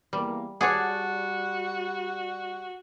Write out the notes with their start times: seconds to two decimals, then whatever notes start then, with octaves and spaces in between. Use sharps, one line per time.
0.13 E2 G3 A#3
0.61 G3 F#4 G#4 C#5 D5 F#5 A5